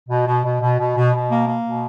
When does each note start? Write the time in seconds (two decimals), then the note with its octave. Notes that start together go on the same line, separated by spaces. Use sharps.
0.09 B2
0.27 B2
0.44 B2
0.61 B2
0.78 B2
0.96 B2
1.13 B2
1.30 A#3
1.47 A#3
1.65 B2